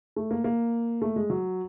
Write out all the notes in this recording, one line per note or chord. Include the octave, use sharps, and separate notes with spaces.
A3
A#3
A#3
A3
G#3
F#3